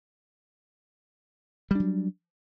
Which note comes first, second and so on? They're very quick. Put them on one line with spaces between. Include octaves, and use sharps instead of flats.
G3 D4 F#3